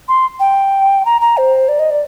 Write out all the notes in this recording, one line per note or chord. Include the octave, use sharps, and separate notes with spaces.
C6
G5
A#5
A#5
C5
D5
D#5
D5